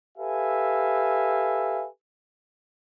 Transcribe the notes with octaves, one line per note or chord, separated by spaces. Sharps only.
G4 A4 B4 E5 F5 G#5